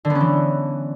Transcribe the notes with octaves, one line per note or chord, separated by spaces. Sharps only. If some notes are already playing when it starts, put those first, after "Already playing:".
D3
B3
C#4
E3